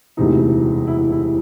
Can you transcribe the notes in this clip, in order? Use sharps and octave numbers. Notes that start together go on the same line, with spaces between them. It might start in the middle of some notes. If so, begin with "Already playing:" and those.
E1 D2 C3 E3 D#4
E4
E4